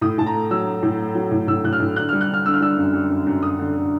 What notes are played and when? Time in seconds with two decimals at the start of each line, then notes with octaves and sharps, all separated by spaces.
0.01 A2 D#6
0.18 A2 A5
0.26 A#5
0.34 A3
0.51 F#3 E6
0.67 A3
0.83 A2
0.99 A3
1.15 F#3
1.31 A2
1.47 A2 E6
1.64 A2 F#6
1.73 F6
1.80 A2
1.96 D3 F#6
2.09 F6
2.12 G3
2.21 F#6
2.29 D3 F6
2.45 D3 E6
2.54 F6
2.61 G3 E6
2.77 F#2
2.93 G3
3.10 F#2
3.26 F#2
3.43 F#2 D#6
3.59 D3
3.76 D3